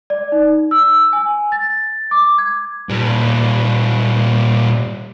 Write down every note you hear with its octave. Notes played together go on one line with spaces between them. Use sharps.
D5
D#4
E6
G#5
A6
D6
G#6
A#2 G3